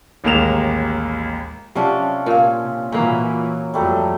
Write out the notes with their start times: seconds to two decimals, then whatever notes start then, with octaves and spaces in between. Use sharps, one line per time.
0.24 A1 D#2 G#3 A#3 E7 F7
1.75 C3 F3 F#3 C#4 D4
2.26 A#2 A#4 F5
2.61 C3
2.92 A#2 E3 F#3 A#3 C#4
3.74 F2 F#3 G3 A3 A#5